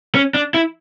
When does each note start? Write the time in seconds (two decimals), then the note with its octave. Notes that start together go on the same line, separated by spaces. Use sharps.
0.15 C#4
0.35 D4
0.54 E4